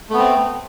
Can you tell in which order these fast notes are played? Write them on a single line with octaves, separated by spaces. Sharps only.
A3 B3 C4